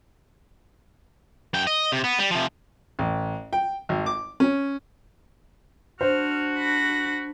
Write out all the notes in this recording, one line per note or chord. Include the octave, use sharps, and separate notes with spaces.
F#2 G5
D#5
C3
B3
G3
C3 F3
A1
G5
G#1
D6
C#4
D4 F#4 C5 F6
B5 A#6